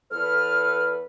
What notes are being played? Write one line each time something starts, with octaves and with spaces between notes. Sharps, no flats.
E2 A4 B4 F6